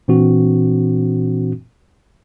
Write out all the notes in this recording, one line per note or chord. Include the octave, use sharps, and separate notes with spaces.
A#2 E3 C4 D4 F#4